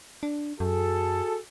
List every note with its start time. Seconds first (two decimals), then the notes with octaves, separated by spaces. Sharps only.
0.23 D4
0.60 F#2 F#4 G#4 A4